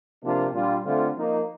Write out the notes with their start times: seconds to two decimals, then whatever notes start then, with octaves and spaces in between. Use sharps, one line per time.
0.22 C3 F3 A#3 D4 F4
0.52 A#2 G3 D4 F4
0.84 D3 A3 C4 F4
1.15 F3 A#3 D#4